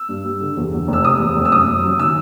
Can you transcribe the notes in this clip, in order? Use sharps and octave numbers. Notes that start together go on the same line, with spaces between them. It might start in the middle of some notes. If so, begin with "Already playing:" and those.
Already playing: E6
G2
G3
D3
E2
E2
F1
E6
C3 D#6
E2
F1
E6
F#2 D#6
F#2
F#3
D#3 E6